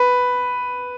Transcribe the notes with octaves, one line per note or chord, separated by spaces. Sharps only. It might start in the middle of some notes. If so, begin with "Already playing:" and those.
Already playing: B4